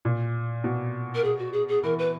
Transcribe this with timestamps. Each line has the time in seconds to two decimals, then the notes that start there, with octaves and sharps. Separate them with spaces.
0.05 A#2
0.64 B2
1.14 A#4
1.24 G#4
1.39 F#4
1.53 G#4
1.68 G#4
1.83 E3 A#4
1.98 B4